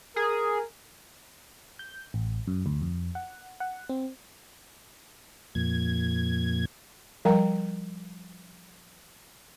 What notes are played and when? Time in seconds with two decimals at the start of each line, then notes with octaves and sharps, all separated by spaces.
0.16 G#4 A#4
1.79 G6
2.14 A1
2.47 F#2
2.66 D2
2.81 F2
3.15 F#5
3.60 F#5
3.89 C4
5.55 F2 A#2 G#6
7.25 F3 G3 A#4 G5 A#5